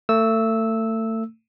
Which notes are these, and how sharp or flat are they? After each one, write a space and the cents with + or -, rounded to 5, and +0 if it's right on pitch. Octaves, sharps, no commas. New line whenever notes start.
A3 +30 E6 -10